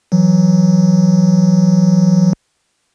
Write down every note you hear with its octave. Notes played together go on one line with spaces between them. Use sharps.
E3 F#3